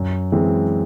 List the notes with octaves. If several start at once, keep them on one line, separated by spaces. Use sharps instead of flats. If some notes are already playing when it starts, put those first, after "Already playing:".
Already playing: F#2
E3 G#3 C4